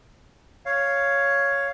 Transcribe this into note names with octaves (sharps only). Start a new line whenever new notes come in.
C#5 F5